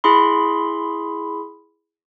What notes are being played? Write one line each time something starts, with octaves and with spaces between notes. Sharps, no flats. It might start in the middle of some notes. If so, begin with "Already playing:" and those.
E4 G#4 B5 C6